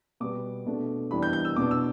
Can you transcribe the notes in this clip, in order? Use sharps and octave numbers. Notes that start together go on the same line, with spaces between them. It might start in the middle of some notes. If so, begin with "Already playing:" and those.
B2 G3 B3 D6
B2 A3 D4
E2 E3 G3 D4 B5
G6
G6
E6
E2 B2 B3 D4 D6
E6